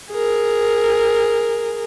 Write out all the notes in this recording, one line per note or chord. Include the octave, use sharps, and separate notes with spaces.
G#4 A#4